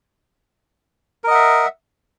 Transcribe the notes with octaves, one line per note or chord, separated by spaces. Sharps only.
A#4 D#5 E5 F#5